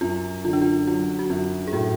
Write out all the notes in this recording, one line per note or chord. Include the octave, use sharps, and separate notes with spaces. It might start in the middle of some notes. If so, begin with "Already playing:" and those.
F#2 F4
D3 F4
D4
F4
F#3 F4
F#4
F#2 F4
G#4
A2 F#4